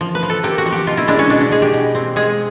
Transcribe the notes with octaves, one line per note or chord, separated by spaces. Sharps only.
F3
B4
F3
A4
A#3 G4
F#4
F3
G4
B2 F4
E4
G#3 D4
C#4
B2 D4
D4
G#3 G#4
G4
B2
C4
G#3 G#4